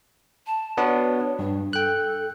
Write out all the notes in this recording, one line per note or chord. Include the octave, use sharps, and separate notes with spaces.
A5
B3 D4 F#4 C#5
G2 D4
A4 G5 F#6